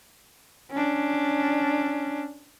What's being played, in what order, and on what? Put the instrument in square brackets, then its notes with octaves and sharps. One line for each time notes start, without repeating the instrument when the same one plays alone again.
[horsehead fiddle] C#4 D4